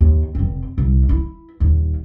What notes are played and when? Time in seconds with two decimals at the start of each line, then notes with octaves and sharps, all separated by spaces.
0.01 D#2
0.35 F1 C4
0.78 C2
1.09 E4
1.60 D#1 D#2